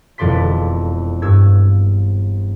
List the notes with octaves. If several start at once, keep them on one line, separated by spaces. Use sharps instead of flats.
E1 F2 D3 D5 C6 B6
G2 E6 G#6